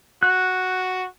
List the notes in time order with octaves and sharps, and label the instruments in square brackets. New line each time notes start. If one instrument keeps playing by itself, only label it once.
[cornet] F#4 [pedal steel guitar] F#6